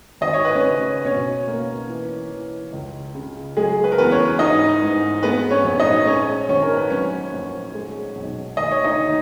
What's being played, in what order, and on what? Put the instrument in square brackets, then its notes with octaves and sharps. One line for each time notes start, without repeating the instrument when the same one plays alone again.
[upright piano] G#1 D#5
C#5
B4
C#4 C#5
C#3
B2 C#4 C#5
A#3
E3
E3
C#2
C#3
F#3 G#3 G#4
B4
A#4
E2 B3 B4
C#4 C#5
G#2 D#4 D#5
G#2
G#3 B3 B4
C#4 C#5
A#1
D#4 D#5
G#3 C#4 C#5
G#1 C#4 C#5
A#4
B4
F#3 C#4 C#5
A#1
G#3
B1
D#2 D#5
C#5
D#4 D#5
D#3